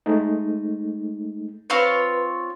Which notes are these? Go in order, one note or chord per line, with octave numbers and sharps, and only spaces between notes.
G#3 A3 D#4
C4 F4 B4 C#5